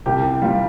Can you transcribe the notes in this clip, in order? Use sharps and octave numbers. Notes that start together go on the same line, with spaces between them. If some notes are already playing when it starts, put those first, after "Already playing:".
C2 G4
G3 F4